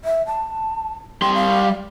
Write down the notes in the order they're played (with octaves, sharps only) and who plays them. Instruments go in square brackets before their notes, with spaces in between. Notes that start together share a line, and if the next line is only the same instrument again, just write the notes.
[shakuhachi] E5
A5
[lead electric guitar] G3 C6 [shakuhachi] G5
[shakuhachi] F5